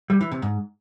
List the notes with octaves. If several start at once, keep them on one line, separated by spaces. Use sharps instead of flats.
G3
E3
C3
G#2